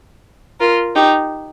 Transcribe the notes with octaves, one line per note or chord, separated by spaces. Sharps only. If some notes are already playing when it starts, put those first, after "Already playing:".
F4 A#4
D#4 G4